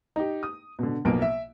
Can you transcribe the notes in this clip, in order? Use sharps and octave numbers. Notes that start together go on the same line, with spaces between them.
D#4 G4
D#6
B2 D3
B1 B2 F3 A#3 D7
E5